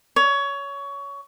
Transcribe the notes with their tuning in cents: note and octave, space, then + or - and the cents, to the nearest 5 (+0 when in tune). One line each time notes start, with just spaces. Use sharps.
C#5 +20